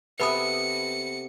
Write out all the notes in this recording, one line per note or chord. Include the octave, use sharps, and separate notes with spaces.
C3 B3 A4 B4 B5 D#6 C#7